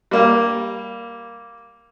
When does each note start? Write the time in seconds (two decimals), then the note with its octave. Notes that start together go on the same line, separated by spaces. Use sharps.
0.11 G3 A#3